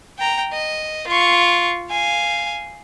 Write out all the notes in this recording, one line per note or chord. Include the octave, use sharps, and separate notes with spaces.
G5 A#5
D#5
F4 C#6
F5 G#5